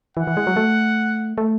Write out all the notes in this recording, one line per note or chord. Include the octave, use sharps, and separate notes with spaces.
E3 F#5
E3
G#3
F#3
A3
A3